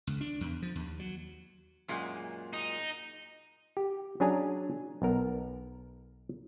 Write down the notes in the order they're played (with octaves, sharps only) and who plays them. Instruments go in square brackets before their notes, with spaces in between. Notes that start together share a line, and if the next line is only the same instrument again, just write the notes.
[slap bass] C#2
D4
E2
F3
D#2
F#3
[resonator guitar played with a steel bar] F#2 A#2 G#3
[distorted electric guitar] D#4
[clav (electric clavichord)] G4
F#3 C#4 D4 G#4 G#5 A#5
B1 B3 A#4